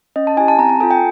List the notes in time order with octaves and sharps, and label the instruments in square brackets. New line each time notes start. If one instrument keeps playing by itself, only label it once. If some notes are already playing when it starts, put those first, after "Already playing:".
[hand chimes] C#4 D#5
A5
E4 G#5
G4
A5
C4 A#5
A5
A4 G#5
F4
G5